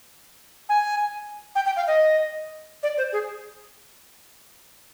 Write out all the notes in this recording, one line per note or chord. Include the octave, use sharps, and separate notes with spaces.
G#5
G5
G5
F5
D#5
D5
C5
G#4